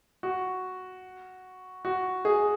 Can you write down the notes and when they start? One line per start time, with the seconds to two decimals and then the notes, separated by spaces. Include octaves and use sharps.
0.23 F#4
1.85 F#4
2.25 G#4